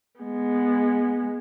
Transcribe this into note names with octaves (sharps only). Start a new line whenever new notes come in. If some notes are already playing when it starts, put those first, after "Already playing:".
G#3 B3